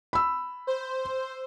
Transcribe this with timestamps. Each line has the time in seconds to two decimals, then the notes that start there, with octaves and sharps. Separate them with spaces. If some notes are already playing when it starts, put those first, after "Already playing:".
0.13 B5 E6
0.67 C5